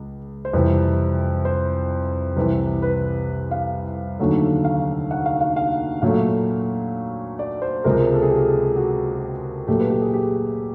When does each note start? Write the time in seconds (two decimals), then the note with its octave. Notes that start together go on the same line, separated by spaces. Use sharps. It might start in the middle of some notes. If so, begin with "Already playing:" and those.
Already playing: C#2
0.45 C5
0.53 F2 C3 E3 G3 B4
1.45 C5
2.36 C2 C3 E3 B4
2.82 B4
3.51 F5
4.20 D#2 D3 F#3 A3
4.64 F5
5.11 F#5
5.26 F5
5.41 F5
5.56 F5
6.01 A#2 F#3 A3 F5
7.39 D5
7.62 C5
7.84 C#2 C3 F3 G#3 A#4
8.14 A4
8.23 G#4
8.30 G4
8.76 F#4
9.68 A#2 F#3 A3 G4
9.80 B4
9.90 G4
10.02 G#4
10.14 G4